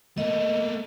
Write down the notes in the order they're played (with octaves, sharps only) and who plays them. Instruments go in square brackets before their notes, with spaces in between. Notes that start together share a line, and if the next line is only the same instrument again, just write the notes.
[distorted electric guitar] A3 A#3 [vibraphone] D#5